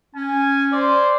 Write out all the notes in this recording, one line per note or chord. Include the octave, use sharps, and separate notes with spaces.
C#4 G#5
C5 D5